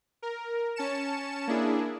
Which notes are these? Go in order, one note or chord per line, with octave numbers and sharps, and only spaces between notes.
A#4
C#4 A5 C#7 E7
A#3 D4 E4 G#4